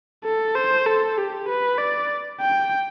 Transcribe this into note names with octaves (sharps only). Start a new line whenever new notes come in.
A4
C5
A4
G4
B4
D5
G5